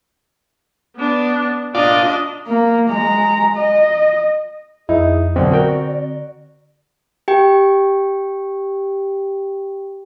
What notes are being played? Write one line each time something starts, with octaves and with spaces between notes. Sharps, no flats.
B3 D4
D4 F4 D5 D#5
A#3
G#3 A#5
D#5
F2 D#4 E4 G#4
B1 D3 C4 D5
F#4 A#4 G5
G4 G5